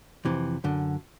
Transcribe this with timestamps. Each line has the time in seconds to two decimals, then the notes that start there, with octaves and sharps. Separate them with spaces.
0.25 F2 C3 E3
0.64 F#2 D3